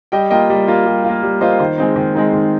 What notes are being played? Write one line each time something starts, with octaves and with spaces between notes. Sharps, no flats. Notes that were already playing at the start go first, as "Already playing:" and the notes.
G3 D#5 G5
A#3 F4 D#5 G5
G3
A#3 F4
G3
A#3 F4
G3
A#3 F4 C5 D#5
D#3 C5
G#3 C4 D#4
D#3
G#3 C4 D#4
D#3